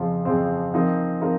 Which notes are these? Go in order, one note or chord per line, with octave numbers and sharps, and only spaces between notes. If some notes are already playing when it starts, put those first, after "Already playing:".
Already playing: F2 C#3 F3 C4
F2 C#3 F3 C4
F3 C4 D#4 A#4
F3 C4 D#4 A#4